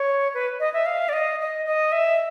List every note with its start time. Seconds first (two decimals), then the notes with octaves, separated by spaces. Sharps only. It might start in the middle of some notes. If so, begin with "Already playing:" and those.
Already playing: C#5
0.34 B4
0.60 D#5
0.74 E5
0.86 F5
1.09 D5
1.13 D#5
1.40 D#5
1.65 D#5
1.92 E5